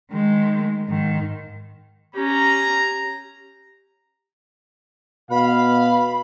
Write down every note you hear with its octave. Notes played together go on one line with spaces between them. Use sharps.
D#3 G#3
G#2 D#3
C#4 G4 A#5
B2 F5 B5